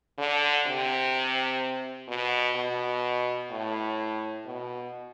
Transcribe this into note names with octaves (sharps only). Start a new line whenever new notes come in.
D3
C3
B2
B2
A2
B2